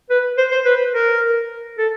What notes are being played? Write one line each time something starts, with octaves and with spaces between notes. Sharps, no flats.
B4
C5
C5
B4
A#4
A4